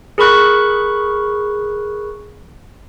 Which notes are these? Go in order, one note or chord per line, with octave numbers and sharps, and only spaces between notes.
G#4 A#4 B5 C#6 F#6